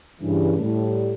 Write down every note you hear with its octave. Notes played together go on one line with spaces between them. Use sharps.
G2 C#3 E3
A2 G3